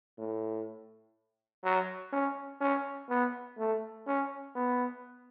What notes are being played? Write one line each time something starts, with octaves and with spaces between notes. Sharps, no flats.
A2
F#3
C#4
C#4
B3
A3
C#4
B3